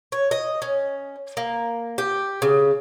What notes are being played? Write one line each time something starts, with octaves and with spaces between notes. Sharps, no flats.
C#5
D#5
C#4
A#3
G4
C#3